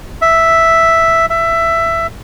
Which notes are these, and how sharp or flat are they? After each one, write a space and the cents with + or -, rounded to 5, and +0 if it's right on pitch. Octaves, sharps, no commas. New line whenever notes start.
E5 +0
E5 +15